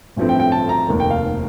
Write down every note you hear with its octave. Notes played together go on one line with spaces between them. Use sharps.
A1 G2 F3 A3 C4
G5
G5
A5
A#5
F1 D#2 D#3
G5
F5